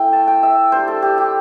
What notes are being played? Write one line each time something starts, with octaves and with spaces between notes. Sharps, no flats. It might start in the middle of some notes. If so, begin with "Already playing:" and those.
Already playing: A3 E4 G5
A5
G5
E5
G3 D4 C5
A4
G4
G4